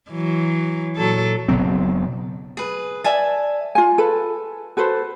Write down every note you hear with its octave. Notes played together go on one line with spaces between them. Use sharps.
E3 F#3
A#2 F#3 A4
F#1 B2 F#3 C4
G#4 B4
D5 E5 G#5 A5
F4 G#5
A4 B4
F#4 A4 B4 C5